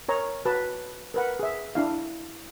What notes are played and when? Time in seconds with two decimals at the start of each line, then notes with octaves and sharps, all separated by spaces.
0.08 A#4 C#5 A#5
0.45 F#4 B4 A5
1.14 A#4 B4 F#5
1.39 G#4 E5
1.75 D4 E4 F5